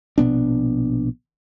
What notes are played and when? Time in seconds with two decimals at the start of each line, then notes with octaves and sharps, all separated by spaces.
0.18 A#1 B2 B3 D4